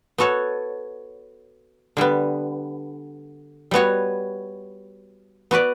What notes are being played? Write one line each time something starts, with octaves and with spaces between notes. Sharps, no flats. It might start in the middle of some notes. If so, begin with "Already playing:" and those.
B3 F#4 A4 C#5
D3 G3 B3
G3 B3 F#4 C#5
B3 F#4 B4 D5